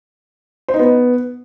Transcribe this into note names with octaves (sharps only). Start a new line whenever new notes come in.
C5
D#4
B3